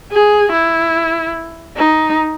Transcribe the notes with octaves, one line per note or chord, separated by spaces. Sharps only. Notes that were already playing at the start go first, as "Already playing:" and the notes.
G#4
E4
D#4